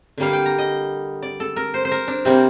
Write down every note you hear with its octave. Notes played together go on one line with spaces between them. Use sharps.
D3 G3 A#3 F5
G5
A#5
D#5
D5
A4
A#4
C5
C5
A#4
D4
C3 G3 A#3 C4